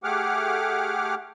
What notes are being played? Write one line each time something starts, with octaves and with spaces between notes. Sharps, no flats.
A3 G4 G#4 F#5 D6 F6